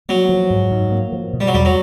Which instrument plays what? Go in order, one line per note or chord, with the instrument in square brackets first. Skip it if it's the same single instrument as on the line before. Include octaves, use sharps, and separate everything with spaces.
[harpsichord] F#3 [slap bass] A#3
[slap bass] F3
G#2
G#2
A#3
F3
B2
[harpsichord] G3
F#3
[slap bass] E2 [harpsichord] G3
[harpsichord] F#3